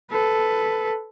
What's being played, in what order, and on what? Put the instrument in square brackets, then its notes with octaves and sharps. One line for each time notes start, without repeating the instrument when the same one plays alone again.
[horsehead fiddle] A4 B4